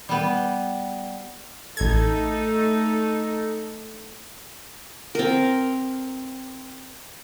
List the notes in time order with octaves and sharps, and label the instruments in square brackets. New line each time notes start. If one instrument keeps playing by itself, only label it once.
[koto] G3 B3
[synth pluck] A1 G#6 [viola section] A3 D#4 A4
[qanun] C4 A#4